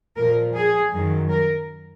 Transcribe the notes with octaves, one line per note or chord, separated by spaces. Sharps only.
A#2 F3 A#4
G#4
F#2 D#3 F#3
A#4